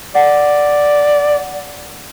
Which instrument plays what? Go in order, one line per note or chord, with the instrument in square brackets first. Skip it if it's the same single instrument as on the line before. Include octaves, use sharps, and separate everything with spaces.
[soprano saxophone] D5 [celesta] F#5